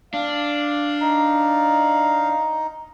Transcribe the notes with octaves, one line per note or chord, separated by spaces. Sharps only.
D4 F5
D#4